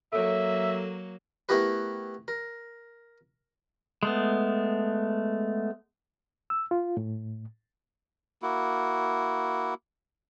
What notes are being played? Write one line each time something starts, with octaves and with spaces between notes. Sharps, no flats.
F#3 A#3 A4 C#5 E5
A3 B3 E4 G4 A#4 B4
A#4
G#3 A3 B3
E6
F4
A2
A#3 E4 F#4